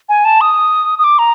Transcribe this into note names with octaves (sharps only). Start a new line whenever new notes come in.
G#5
A5
D#6
D#6
D6
A#5